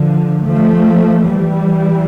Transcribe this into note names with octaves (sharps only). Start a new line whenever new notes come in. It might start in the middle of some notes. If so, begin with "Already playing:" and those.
Already playing: D3 F3
F3 A3
E3 G3